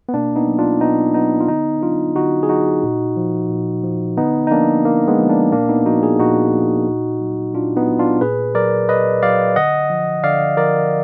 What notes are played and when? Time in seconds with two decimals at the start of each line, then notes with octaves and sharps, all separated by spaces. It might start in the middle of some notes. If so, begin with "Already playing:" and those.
0.09 B3
0.14 B2 A#3 D4
0.36 B3 D#4
0.47 F#3
0.59 D4 F4
0.81 B2 B3 D#4
1.14 F#3 B3 D#4
1.40 F4
1.48 D3 B3 D#4
1.82 F#3 D4 F4
2.16 D3 D#4 F#4
2.43 G#4
2.49 F#3 D#4 F#4
2.84 A#2
3.17 F3
3.50 A#2
3.84 F3
4.17 D3 B3 D#4
4.47 D#4
4.51 F3 A#3 D4
4.85 D3 A#3
5.08 G#3 B3
5.19 F3
5.29 A#3 D4
5.52 A#2 A#3 D4
5.69 B3 D#4
5.86 F3 D#4 F#4
6.03 F4 G#4
6.19 A#2 D#4 F#4
6.54 F3
6.87 A#2
7.20 F#3
7.54 A#2 D4 F4
7.77 B3 D#4
7.88 F#3
7.99 D4 F4
8.21 A#2 G#4 B4
8.55 F#3 A#4 D5
8.89 A#2 B4 D#5
9.23 F#3 D5 F5
9.56 D3 D#5 F#5
9.90 F3
10.24 D3 D5 F5
10.57 F3 A#4 D5